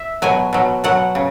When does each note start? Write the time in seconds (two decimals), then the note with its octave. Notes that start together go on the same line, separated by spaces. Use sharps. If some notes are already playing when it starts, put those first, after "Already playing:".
Already playing: E5
0.22 B2 F#3 G#5
0.53 B2 F#3
0.84 B2 F#3 F#5
1.15 C#3